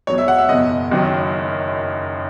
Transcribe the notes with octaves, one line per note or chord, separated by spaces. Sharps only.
E1 E2 B2 F#3 C#5
E5
F#5
E5
F#1 E2 B2 D#5
F#1 F#2 D#3 F#3